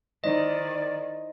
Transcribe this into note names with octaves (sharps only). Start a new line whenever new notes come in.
D#3 D#4 E4 C5 D5 D#5